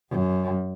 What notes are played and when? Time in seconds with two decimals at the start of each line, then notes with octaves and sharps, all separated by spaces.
0.10 F#2